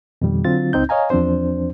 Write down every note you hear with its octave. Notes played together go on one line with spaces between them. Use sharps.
F2 B2 D#3 G3
D3 F#3 C4 F4 A6
C#2 C4 D#4 G6
C#5 D#5 F5 G#5 A#5
E2 F3 C4 D4 C5